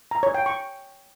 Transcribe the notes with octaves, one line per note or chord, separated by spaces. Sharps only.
A#5
C#5
G5
C#6